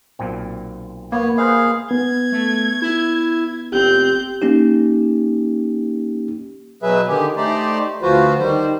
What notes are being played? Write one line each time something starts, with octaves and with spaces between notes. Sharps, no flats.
B1 A#2 C4
A#3 B3 C#5
G#4 B4 C5 D#5 F5
B3 G#6
A3
E4
F1 C4 G4 G6
A#3 C#4 D#4 G4
B2 F#3 G#4 B4 E5
D3 D#3 G4 G#4
A3 D#4 G4 C5 D5
D2 F3 F4 F#4 B4 C5
D#3 G3 C5